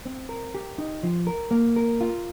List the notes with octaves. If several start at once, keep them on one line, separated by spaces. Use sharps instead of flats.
C4
A#4
G4
D#4
F3
A#4
A#3
A#4
F4